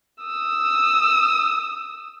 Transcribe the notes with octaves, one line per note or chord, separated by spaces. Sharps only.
D#6 E6